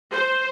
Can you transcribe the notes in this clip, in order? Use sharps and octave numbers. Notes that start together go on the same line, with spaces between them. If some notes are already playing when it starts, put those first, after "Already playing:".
C5